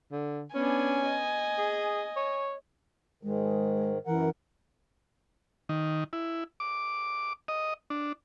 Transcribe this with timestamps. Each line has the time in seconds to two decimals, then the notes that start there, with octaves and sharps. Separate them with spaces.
0.12 D3
0.55 B3 C#4 D4 G#5
1.07 D#5
1.59 G#4
2.16 C#5
3.23 G#2 D#3 G#3
4.07 F#2 E3 A#4 F#5
5.69 D#3
6.13 E4
6.60 D6
7.48 D#5
7.90 D4